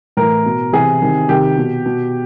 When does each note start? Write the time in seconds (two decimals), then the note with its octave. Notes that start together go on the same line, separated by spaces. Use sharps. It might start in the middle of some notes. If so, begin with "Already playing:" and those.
0.17 A2 E3 A#4
0.45 B2
0.73 C3 E3 G#4
1.01 C3 D#3
1.29 C3 D#3 G4
1.57 B2
1.85 B2